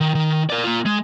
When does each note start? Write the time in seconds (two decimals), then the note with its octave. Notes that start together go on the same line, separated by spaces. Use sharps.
0.01 D#3
0.15 D#3
0.50 A#4 D5
0.64 A#3 F4
0.86 G#3